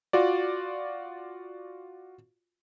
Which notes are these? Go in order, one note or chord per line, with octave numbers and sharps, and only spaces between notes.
F4 F#4 D5